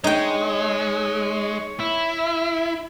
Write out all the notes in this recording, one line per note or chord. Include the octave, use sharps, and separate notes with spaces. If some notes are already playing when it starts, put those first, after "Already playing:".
G#3 D#4 C#5 G5
E4